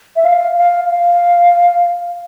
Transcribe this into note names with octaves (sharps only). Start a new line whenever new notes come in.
E5
F5
F5
F5